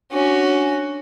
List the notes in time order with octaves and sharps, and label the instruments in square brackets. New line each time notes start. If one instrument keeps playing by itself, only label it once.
[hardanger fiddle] C#4 F#4 [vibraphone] D4 G#5